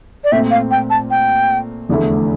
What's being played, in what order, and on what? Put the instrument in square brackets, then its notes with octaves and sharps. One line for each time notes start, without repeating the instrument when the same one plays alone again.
[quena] D5
[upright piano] A#2 A3 C4 [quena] E5
[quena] F5
G5
A5
G5
[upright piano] F1 E2 D3 A3 E4